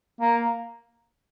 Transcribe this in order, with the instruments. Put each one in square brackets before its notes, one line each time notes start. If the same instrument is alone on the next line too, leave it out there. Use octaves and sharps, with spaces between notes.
[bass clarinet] A#3